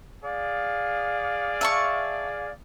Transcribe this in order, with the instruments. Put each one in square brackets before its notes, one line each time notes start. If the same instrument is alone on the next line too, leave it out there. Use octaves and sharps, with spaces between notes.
[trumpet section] G#4 D5 F5
[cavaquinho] E5 A5 C#6